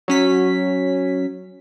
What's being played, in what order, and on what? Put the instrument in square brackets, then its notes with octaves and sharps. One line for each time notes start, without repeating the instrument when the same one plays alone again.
[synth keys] F#3 C#4 B6